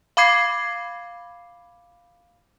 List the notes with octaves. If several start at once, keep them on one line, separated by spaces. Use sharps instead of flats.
F5 B5 D6 G#6 C7